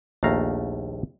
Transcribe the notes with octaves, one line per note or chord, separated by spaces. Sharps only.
A#1 D#2 A3 F5 A#5